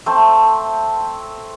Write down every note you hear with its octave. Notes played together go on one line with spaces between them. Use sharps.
A3 C4 C5 A5